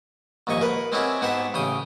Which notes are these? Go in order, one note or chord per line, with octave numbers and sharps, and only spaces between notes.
A#1 D#2 G#2 D#5 C#6
A#4 B4
G#3 C4 C#4 E4 F#4 G4
G#2 B3 F#4 G4 C5 E5
A1 C#3 G5 D#6